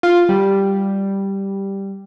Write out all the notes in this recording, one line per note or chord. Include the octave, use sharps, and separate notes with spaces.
F4
G3